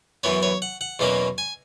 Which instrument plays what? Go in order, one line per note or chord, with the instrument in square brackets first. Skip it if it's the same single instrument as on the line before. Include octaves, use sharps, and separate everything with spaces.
[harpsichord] F#2 E3 B3 C#5
C#5
F#5
F#5
E2 B2 F#3 A#3 C#4
G#5